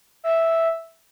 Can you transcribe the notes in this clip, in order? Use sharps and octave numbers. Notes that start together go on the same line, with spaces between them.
E5